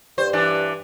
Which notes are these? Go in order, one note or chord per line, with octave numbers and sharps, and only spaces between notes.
G2 C5
E3 D4